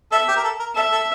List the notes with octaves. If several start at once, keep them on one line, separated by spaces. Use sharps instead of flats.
A4 E5
G4
A#4
A4
A#4
A4 E5
A4